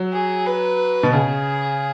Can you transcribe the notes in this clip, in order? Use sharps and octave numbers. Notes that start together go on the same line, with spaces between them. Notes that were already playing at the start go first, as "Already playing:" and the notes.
Already playing: F#3
G#4
B4
B2
C#3 G#4